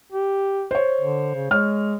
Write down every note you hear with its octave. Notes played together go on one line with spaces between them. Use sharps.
G4
C5 C#5
D3
C#3
G#3 C#5 F6